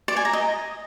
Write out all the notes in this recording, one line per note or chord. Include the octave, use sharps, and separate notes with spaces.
D5
G#5
A#5
D#5